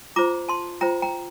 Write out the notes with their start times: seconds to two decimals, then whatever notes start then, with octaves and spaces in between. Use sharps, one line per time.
0.16 F4 C5 A#5 D6
0.49 A5 C6
0.81 F4 C5 G5 A#5
1.02 G5 A#5